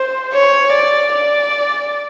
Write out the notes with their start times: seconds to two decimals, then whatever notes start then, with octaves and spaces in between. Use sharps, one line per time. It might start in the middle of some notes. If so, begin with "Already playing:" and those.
Already playing: C5
0.34 C#5
0.73 D5
1.13 D5